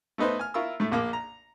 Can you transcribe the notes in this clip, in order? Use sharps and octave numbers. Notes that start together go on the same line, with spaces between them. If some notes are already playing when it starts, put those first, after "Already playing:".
A3 B3 D#4 B4 C5
G#5 F6
E4 F4 A#4 C#6 E6
A2 A3
A#1 A#3 D6
A#5